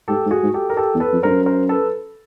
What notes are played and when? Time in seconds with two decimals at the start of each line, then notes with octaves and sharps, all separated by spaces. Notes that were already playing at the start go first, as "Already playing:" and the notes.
0.08 G#2 G4 A4
0.25 G#2
0.31 F#4 G#4
0.43 G#2
0.54 G4 A4
0.70 A#4
0.77 G4 A4
0.94 E2
1.00 A4 B4
1.12 F2
1.23 G2 A#4 C5
1.30 F#2
1.46 A#4 C5
1.69 A4 B4